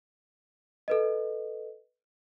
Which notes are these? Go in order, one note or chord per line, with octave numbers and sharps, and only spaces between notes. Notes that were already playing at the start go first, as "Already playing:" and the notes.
A4 B4 D#5